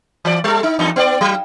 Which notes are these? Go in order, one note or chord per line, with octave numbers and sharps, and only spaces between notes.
E3 D5
G3 A4
D#4
E2 G2 D#4
B3 C#5 D5
F#3